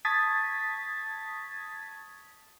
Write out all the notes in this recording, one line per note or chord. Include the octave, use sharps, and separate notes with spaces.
A5 C#6 D#6 G#6 A6 B6